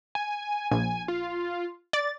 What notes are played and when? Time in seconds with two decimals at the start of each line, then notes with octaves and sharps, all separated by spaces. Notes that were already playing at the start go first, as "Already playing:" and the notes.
0.15 G#5
0.71 A#1 G#5
1.08 F4
1.93 D5 A6